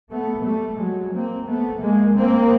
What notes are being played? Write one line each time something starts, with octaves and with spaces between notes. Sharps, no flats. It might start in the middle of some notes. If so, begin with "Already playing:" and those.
A3 B3
G3 A3
F#3 G#3
A#3 C4
A3 B3
G#3 A#3
A#3 C4